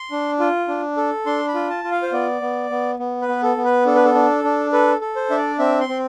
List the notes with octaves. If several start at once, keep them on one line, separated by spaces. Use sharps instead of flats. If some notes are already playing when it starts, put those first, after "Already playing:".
Already playing: C6
D4
F4
D4
A4
D4 C6
B5
F4
A5
F4
F5
C5
B3 D5
B3
B3
B3
B4
B3
A4
B3
B4
D4 A4
B4
A4
D4
D4
A4 B4
A4
C5
D4 E5
D5
C4 E5
C6
C4